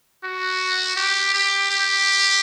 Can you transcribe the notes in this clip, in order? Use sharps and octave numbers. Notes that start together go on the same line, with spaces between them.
F#4
G4
G4
G4